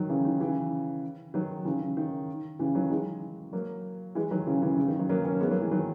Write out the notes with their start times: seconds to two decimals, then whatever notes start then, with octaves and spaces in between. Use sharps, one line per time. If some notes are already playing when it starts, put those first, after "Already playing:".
Already playing: D#3 F#3
0.09 C#3 E3
0.25 D#3
0.41 C#3 E3
1.34 D#3 F#3
1.65 C#3 E3
1.81 C#3
1.97 D#3
2.59 C#3 E3
2.75 D#3 F#3
2.90 E3 G#3
3.53 F#3 A#3
4.15 E3 G#3
4.31 D#3 F#3
4.47 C#3 E3
4.62 C#3 E3
4.78 C#3
4.88 D#3
4.99 D#3 F#3
5.09 F#3 A#3
5.25 A#3 C#4
5.40 G#3 B3
5.51 F#3 A#3
5.61 E3 G#3
5.71 D#3 F#3